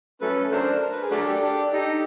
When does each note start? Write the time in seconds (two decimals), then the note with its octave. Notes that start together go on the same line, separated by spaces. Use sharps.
0.21 F#3 A3 C#4 A4 B4
0.51 F#3 A3 D4 A#4 C5
0.82 A#4
0.92 B4
1.02 G#4 A#4
1.11 F#3 A3 D4
1.26 G4 A4
1.42 D4
1.72 D#4 G4 A4